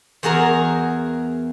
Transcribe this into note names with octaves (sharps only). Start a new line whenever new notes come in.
E2 F#4 G#4 A#4 A#5